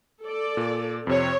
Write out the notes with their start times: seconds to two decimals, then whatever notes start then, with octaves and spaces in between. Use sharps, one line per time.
0.23 A4 D5
0.57 A#2
1.07 F2 C3 C4 C#5